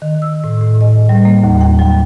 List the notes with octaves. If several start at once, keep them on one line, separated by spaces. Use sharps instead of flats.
D#3
E6
A2
A2
D#5
G3
A#3
D#2
G5
F#3